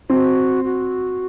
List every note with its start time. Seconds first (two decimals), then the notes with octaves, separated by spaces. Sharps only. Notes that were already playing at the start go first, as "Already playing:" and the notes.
0.10 C4 F#4
0.65 F#4